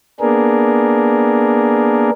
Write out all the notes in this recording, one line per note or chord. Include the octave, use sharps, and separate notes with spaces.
A#3 B3 D4 G#4 A#4